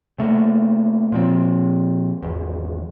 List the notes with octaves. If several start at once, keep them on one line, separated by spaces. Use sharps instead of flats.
C3 A3 A#3
A#2 F3 C4
G#1 E2